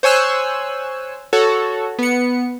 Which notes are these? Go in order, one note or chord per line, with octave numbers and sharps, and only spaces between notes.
C5 C#5 G#5 E6 F#6
F#4 A4 C#5
B3 C#7